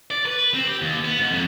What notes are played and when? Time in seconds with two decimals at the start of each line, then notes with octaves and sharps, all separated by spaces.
0.11 D5
0.26 B4
0.54 C4
0.67 G4
0.82 D#2
1.04 B3
1.18 G#2
1.31 F2